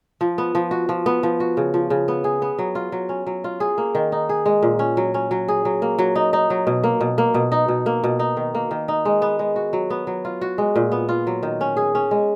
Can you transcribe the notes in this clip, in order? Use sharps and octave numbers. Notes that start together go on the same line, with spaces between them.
F3
B3
F3
F#4
F3
B3
F3
F#4
C#3
F3
C#3
B3
G#4
B3
F#3
F4
F#3
C#4
F#3
F4
G#4
A#3
D#3
D#4
G#4
G#3
A#2
C#4
F#3
C#4
F#3
G#4
F#3
A#3
F#3
D#4
D#4
F#3
B2
A#3
B2
A#3
B2
D#4
B2
A#3
B2
D#4
D#3
A#3
D#3
D#4
G#3
B3
G#3
F#4
F#3
B3
F#3
F4
F#4
G#3
A#2
B3
F4
F#3
D#3
C#4
G#4
C#4
G#3